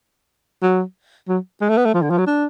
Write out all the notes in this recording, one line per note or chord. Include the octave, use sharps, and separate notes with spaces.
F#3
F#3
G#3
A3
B3
A3
F3
D3
F3
F#3
D4